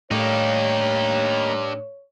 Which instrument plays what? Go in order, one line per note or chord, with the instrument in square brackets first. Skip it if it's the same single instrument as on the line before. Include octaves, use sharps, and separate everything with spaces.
[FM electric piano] A2 A3 C#6 [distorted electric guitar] A#3 D#4 [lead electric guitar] D4 G4 [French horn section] C#5